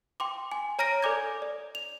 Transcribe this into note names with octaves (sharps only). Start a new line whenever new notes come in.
G5 C6 D6
G#5
C#5 A#5 F6 A#6 D7
A4 D5 G#5 D6 G6 G#6
D5
F7